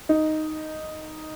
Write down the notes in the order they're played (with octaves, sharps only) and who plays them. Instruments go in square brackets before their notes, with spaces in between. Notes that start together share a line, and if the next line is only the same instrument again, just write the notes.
[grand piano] D#4